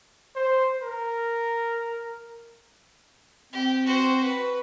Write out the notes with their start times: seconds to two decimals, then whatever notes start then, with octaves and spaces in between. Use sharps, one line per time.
0.35 C5
0.82 A#4
3.53 C4 G4
3.85 F#4 C5
4.22 B4